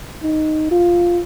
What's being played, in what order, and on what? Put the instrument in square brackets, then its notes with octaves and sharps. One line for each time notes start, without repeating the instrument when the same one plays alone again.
[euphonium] D#4
F4